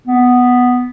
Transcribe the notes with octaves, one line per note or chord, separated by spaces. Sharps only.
B3